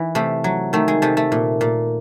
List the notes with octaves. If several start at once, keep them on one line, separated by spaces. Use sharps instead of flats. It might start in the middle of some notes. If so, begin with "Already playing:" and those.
Already playing: E3
C3 A3
F#3
D#3 A3
G#3
C3 A3
A3
A#2
A#2